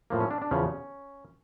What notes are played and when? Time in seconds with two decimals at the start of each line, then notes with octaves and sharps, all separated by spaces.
0.10 A2 F3 A#3
0.20 C#4
0.31 D4
0.42 D4
0.51 E2 C#3 F3 C#4